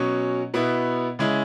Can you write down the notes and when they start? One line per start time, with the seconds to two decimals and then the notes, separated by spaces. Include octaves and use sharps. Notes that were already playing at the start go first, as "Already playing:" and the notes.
Already playing: B2 F#3 C#4
0.54 B2 B3 E4
1.19 C#3 G#3 C#4 E4